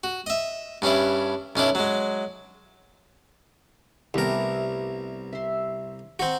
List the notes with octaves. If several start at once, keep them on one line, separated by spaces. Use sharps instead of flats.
F#4
D#5 E5
G2 C#4 D4 E4
B1 C#4 D4 E4
F#3 G#3
C2 A3 B3 G4 A#4
E5 C6
C4 F#4 A#5